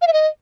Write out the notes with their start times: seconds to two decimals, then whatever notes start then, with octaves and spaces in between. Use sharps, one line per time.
0.02 F5
0.07 E5
0.13 D#5